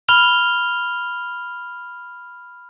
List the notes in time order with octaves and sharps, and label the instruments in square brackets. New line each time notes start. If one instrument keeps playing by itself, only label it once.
[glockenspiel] B5 F6 F7 G7